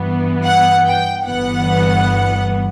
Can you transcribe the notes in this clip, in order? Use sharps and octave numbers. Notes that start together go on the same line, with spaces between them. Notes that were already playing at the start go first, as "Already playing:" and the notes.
Already playing: G2 E3 B3
F#5
G5
G1 G2 E3 B3 F#5